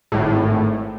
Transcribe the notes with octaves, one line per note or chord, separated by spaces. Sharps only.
G#1 A2